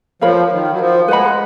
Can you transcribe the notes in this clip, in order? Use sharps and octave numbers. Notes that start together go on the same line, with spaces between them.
F3 A#4 C#5 F5 B5
F3
D#3
F#3
F3
G#3 B4 F#5 B5